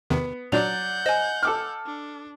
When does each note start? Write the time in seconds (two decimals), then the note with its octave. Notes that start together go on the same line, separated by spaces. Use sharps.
0.10 E2 C3 D#3 B3
0.52 A#2 F#3 D4 D5 F#5 G6 F7
1.06 C5 D#5 G#5
1.43 A4 D6 F6
1.86 D4